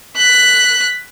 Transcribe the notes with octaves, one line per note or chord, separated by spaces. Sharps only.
F#6 B6